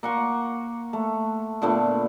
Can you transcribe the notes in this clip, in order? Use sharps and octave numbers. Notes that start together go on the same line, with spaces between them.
A#3 F#5 C6 C#6
A3
A#2 D3 A3 B3